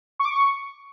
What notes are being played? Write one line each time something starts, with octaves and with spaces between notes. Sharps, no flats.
C#6
D6
C#6